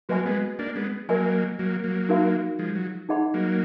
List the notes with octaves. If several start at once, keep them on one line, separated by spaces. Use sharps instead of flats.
F#3 A#3 F#4 B4 D#5 G#5 B5
G#3 B3
A#3 D4
G#3 B3
F#3 A#3 A#4 D#5 G#5 B5
F#3 A#3
F#3 A#3
D#4 F#4 A#4 F5 B5
F3 G#3
F#3
D#4 G#4 D#5 F#5 B5
F#3 A#3